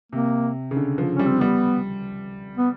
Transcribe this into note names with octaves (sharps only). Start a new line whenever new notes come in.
C3 A#3
C#3
D3
F3
G3 C#4
C4
G3 B3
B3